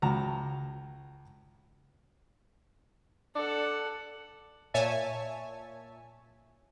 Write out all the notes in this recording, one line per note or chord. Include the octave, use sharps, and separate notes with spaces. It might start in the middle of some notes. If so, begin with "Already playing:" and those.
C#2 F#4 A5 A#5
D4 A4 F#5
A#2 C#5 E5 G#5 A5